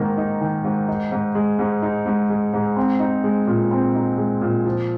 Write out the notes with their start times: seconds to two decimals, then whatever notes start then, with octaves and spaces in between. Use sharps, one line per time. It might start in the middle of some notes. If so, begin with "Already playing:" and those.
Already playing: G#2 D#3 A#3
0.17 D#4
0.41 D#3
0.64 G#2
0.88 D#4
1.12 G#2
1.35 G#3
1.59 G#2
1.82 D#4
2.06 G#2
2.30 G#3
2.53 G#2
2.77 C4
3.00 D#4
3.24 G#3
3.47 A#2
3.71 C4
3.95 D#4
4.18 G#3
4.41 A#2
4.65 F3